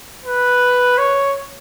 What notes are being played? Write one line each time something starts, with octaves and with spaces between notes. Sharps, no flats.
B4
C#5